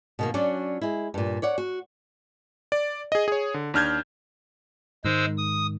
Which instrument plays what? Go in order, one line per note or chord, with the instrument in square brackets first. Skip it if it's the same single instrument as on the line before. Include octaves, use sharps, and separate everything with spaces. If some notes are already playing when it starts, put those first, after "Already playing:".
[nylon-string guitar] B2 D#3 A#3
F#3 C#4 D4 F#4 D5
G#3 E4
G2 A#2
C#5 D5 F#5
F#4
[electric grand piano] D5
G#4 D#5
G#4 C#5
D3
D#2 D4 F6 G6 G#6
[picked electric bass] G#2 D#3 [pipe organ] G#3 C5 E6
[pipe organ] D#6